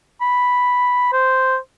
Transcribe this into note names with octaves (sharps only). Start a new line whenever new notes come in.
B5
C5